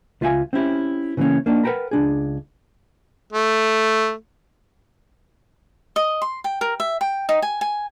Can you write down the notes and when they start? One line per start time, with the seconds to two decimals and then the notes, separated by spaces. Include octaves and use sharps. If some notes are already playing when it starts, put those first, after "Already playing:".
0.21 C#2 F4 E5 F5 G#5
0.53 C4 C#4 E4 G4
1.17 C#3 E3 A3 A#3 C#4
1.46 A#3 D4 D#4
1.63 A#4 B4 F#5 G5 A#5 B5
1.91 C#2 D4 G#4
3.33 A3
5.96 D#5
6.22 C6
6.44 G5
6.61 A#4
6.80 E5
7.01 G5
7.29 D#4
7.42 G#5
7.61 G#5